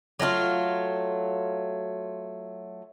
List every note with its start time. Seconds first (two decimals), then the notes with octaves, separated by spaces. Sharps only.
0.19 F#3 A3 D#4 F4